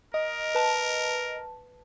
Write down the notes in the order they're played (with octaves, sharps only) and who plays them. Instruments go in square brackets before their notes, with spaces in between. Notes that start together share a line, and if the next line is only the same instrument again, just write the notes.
[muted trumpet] A#4 [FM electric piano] D#5
[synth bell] B4 A5